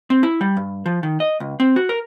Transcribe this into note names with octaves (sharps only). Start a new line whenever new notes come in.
C4
E4
G3
G2
F3
D#3
D#5
C#2
C4
F#4
A#4